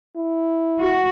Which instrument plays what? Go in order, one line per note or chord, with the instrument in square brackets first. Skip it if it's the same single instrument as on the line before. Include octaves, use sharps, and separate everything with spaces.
[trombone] E4
[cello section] F#4